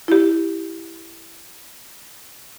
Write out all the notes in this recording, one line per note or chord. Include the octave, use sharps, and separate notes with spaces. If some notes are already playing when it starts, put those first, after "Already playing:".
E4 G4